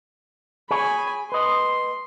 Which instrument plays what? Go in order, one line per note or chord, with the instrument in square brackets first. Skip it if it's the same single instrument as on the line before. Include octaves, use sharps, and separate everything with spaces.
[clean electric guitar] G#4 C#5 [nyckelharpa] G#5 B5
[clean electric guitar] B4 D#5 [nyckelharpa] C6